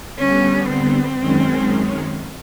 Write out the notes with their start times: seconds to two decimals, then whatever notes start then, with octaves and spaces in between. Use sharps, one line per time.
0.19 D3 G3 B3 C#4
0.69 C4
1.19 F#2 D#3 G#3 C#4